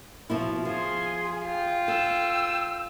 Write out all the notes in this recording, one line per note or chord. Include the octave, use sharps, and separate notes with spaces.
B2 F3 E4
F3 G#4 C6
F4 G5
A4 E6